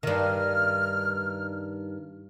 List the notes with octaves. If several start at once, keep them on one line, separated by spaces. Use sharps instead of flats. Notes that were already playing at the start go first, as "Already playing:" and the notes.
G2 D#3 F6